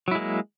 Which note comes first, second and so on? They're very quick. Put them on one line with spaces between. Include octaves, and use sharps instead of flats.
F#3 E4 G#3 A#3